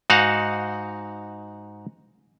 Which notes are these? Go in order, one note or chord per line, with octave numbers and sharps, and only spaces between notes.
G#2 D#4 F#4 F5 F#5